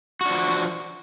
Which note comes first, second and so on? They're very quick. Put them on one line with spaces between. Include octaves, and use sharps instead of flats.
F#4 D4 F3